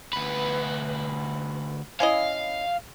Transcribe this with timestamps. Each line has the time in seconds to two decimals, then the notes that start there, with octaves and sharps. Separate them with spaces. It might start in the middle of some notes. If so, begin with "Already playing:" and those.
0.13 D2 B4
2.00 C#4 E4 D#5 F5